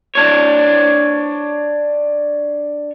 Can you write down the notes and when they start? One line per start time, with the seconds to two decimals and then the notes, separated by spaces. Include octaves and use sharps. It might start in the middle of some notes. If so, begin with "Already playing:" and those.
0.15 D4 C#5